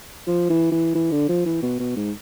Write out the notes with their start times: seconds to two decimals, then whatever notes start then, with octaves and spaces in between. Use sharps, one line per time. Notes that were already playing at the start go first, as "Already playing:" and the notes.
0.27 F3
0.50 E3
0.72 E3
0.95 E3
1.12 D3
1.29 F3
1.46 E3
1.63 B2
1.80 B2
1.96 G#2